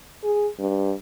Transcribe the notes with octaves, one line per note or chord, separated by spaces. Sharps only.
G#4
G2